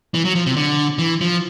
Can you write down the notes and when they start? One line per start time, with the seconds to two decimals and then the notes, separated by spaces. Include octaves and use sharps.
0.14 E3
0.25 F#3
0.35 F3
0.46 C3
0.57 D3
0.98 E3
1.21 F3